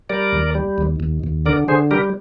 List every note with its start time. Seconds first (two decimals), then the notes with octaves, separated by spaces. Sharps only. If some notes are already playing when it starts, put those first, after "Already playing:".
0.10 G3 A#4 D5
0.33 D#2
0.55 G3
0.78 D#2
1.00 D#2
1.24 D#2
1.46 D3 A#4 D5
1.68 D3 G#4 C5
1.91 G3 G4 A#4